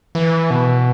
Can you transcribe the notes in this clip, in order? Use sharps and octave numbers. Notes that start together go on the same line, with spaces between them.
E3
B2